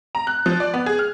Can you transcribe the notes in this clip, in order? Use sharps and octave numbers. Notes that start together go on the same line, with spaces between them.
A#5
F#6
F3
D5
B3
G#4
F6